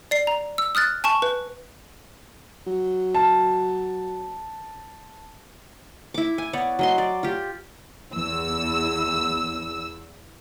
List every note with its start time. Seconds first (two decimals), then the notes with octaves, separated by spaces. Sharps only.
0.11 D5 C7
0.27 A#5
0.58 E6
0.75 D#6 F6 F#6 A6
1.04 G#5 A5 C#6 E7
1.22 B4
2.67 F#3
3.15 A5
6.14 E4 D6
6.38 G#5
6.53 B3 C#5 D5
6.79 F#3 D#5 C6
6.98 D5
7.23 F4 G4
8.12 E2 E6